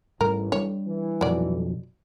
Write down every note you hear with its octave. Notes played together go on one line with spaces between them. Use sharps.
A1 G#2 G3 A#4
G3 A3 D4 C#5
E3
B1 F2 F#3 D5